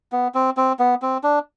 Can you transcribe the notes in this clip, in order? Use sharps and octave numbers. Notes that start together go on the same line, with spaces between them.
B3
C4
C4
B3
C4
D4